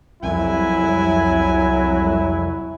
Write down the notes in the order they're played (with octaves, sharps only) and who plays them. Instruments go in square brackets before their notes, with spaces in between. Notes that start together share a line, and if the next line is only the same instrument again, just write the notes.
[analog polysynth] C2 F2 [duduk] F#3 [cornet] E4 [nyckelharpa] G#5